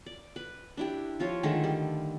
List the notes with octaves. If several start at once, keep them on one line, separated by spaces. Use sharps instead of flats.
D5
B4
D4 E4 G4
F3 F4 C#5
D3 D#3 G#3 A3
G3